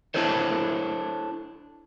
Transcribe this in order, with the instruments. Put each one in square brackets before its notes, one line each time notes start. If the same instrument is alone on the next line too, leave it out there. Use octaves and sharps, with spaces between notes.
[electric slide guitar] D4 E4 A4 C5 C#5